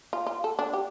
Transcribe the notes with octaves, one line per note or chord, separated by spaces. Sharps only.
F4
F4
A4
D4
G4